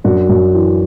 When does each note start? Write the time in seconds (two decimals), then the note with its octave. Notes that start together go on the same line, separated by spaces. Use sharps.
0.04 F#2 D4 F#4
0.29 F#2
0.54 E3